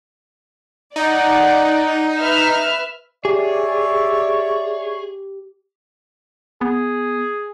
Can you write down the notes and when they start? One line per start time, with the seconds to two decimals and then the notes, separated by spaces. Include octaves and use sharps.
0.96 D#4 D5 F#5
2.20 B4 E5 F6
3.25 G4 G#4 C#5 D5 E5
6.61 B3 G#4